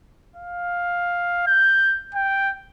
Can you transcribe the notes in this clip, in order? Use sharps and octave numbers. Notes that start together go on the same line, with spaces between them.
F5
G6
G5